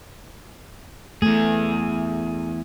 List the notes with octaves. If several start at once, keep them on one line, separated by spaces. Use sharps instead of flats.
E2 A3 G#4